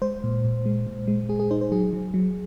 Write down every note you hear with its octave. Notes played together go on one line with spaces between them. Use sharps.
G#3 C5
A#2
A#2
G#3
A#2
G#3
G#3 G#4
G#4
D#4 C5
C5
F#3 G#4
F#3
F#3